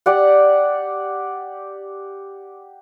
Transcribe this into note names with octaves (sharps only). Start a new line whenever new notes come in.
G4 D5 F#5